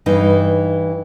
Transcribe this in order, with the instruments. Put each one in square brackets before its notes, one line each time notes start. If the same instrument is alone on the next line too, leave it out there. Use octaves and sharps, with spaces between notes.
[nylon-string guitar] G2 E3 D#4